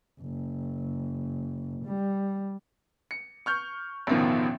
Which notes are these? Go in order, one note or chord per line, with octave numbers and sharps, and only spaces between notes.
F#1
G3
C#7
C#6 F6 G6
A1 E2 B2 D#3 F3